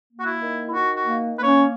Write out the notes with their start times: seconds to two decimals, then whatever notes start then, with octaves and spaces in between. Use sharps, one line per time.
0.11 A#3
0.20 F#4
0.26 E4
0.42 D#3
0.69 E4
0.73 D#3 F#4
0.96 F#4
1.05 A#3
1.36 A#3 B4
1.43 C#4 C#5